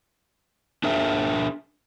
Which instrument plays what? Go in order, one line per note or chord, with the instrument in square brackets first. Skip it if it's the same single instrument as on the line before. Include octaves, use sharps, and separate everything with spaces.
[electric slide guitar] D4 G#4 A#4 E5